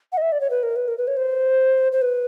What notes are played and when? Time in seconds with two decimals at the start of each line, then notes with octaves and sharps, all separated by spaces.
0.12 F#5
0.17 D#5
0.22 E5
0.32 D5
0.41 C#5
0.50 B4
0.63 A#4
0.76 B4
0.88 A#4
0.98 B4
1.07 C#5
1.17 C5
1.92 C5
2.02 B4